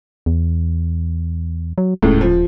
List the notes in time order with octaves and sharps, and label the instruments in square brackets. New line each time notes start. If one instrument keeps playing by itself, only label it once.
[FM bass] E2
F#3
[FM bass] D#1 [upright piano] C#2 A2
[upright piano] F3